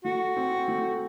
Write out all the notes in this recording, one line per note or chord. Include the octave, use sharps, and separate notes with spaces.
A3 F#4
C4
A3